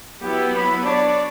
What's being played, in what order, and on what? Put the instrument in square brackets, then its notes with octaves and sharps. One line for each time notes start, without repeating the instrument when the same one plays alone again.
[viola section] F#3 B3 E4 [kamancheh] G4
[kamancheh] B5
[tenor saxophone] D4 [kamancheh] C#5 [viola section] D5